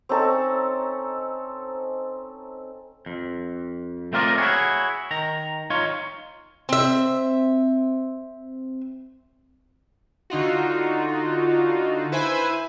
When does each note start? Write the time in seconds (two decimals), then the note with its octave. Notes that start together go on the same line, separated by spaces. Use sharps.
0.09 C4 C#4 D#4 A4
3.06 F2
4.13 A3 C4 F4 A#4 D5 D#5
4.38 E4 F#4 G#4 C#5
5.11 D#3 A#5
5.70 D#4 F4 C#5
6.69 C4 E5
10.30 D3 D#4 F4 F#4
12.12 E4 B4 C5 E5 G#5